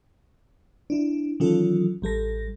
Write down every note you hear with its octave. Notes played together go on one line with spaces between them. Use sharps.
D4 E4
D#3 E3 F#3 C#4 F4 A4
A1 G3 A4 A#6